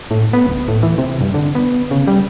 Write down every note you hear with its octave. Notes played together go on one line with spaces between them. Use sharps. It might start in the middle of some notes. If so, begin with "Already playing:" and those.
A2
B3
D1
A2
E3
C3
G2
D3
B3
C#3
G3